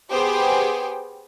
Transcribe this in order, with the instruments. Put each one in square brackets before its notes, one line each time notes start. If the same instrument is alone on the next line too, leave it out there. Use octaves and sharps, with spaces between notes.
[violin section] B3 G4 G#4 C5 G5